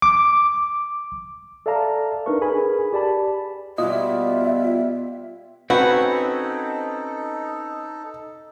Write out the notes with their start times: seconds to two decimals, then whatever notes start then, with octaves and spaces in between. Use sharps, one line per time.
0.02 D6
1.66 A4 D5 E5 F5 A5 A#5
2.26 D4 D#4 A#4 B4 C#6
2.41 G#4 A#4 B4 G#5 B5
2.93 G4 D5 A5 B5
3.78 B2 G3 F4 D#5 E5
5.70 C4 C#4 D#4 F#4 A4 B4